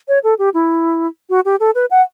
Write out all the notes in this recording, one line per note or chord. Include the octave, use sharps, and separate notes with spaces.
C#5
A4
G4
E4
F#4
G4
A4
B4
F#5